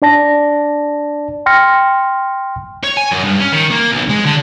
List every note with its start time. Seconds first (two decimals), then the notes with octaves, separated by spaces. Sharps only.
0.02 D4 D5 A5 A#6
1.46 G5 C6 F6 A#6 C#7
2.83 C#5
2.97 G#5
3.11 F#2
3.24 G2
3.40 C#4
3.52 D#3
3.71 A#3
3.92 B1
4.09 G#3
4.25 D3